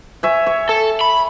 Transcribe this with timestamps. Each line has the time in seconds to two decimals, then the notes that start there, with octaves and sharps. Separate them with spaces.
0.23 C#5 E5 G#5
0.46 C#5
0.69 A4
1.01 B5